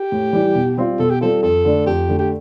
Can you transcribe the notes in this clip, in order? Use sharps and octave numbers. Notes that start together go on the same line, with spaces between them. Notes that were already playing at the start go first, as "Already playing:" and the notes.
Already playing: G4
A2
E3 G3
B2
G3 C4 F4
B2 A4
G4
G3 C4 F4 A4
F2 A4
D3 A3 D4
F2 G4
D3 A3 D4
G4